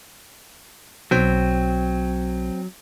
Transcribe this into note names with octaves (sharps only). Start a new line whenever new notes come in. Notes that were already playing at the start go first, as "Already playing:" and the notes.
B1 F#3 C4 G5